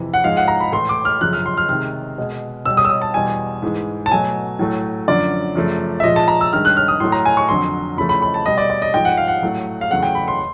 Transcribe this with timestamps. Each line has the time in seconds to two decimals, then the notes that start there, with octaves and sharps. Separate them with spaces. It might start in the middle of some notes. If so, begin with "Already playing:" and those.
Already playing: F2 C3 E3
0.14 F#5
0.24 G#2 F3 G#3 F5
0.37 F#5
0.48 A#5
0.60 B5
0.72 A2 E3 A3 C6
0.89 D6
1.05 F6
1.21 F#2 C#3 F3 F#6
1.33 F6
1.46 C6
1.57 F6
1.69 C3 D#3 G#3 F6
2.18 B2 G#3
2.66 B2 G3 E6
2.77 D#6
2.85 E6
2.89 D#6
3.02 A5
3.14 E2 B2 G3 G#5
3.62 G#2 E3 G#3
4.06 A5
4.11 B2 F#3 A3 G#5
4.59 A2 F#3 A3
5.08 F#2 D3 F3 D5
5.55 F#2 C#3 F3 A3
6.00 E5
6.04 A#2 F3 G#3 D#5
6.16 A5
6.28 A#5
6.41 E6
6.53 G2 D#3 G#3 F6
6.65 F#6
6.77 F6
6.88 D#6
7.00 A2 F#3 A3 C6
7.12 A#5
7.25 G#5
7.37 C#6
7.49 F2 D3 F#3 C6
7.97 E2 C#3 F3 A3 B5
8.09 B5
8.22 B5
8.34 A5
8.46 B2 G3 D#5
8.58 D5
8.70 D5
8.82 D#5
8.94 G#2 F3 G#3 G5
9.05 F#5
9.17 F5
9.28 F#5
9.42 A2 F#3 A3
9.81 F5
9.91 E2 C#3 F#3 A3 F#5
10.03 G5
10.15 B5
10.28 C6